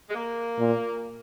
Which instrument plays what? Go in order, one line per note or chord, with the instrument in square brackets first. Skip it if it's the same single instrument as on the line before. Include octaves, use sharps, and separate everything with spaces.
[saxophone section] G#3
A#3
[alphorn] A#2